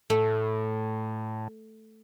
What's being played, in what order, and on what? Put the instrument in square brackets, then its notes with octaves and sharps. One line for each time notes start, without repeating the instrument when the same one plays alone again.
[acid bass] A2 [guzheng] A3